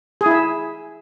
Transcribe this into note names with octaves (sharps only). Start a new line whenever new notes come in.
G#4
E4
E5